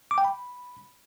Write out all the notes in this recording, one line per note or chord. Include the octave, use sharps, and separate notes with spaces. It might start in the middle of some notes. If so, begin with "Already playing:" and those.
D6
G5
B5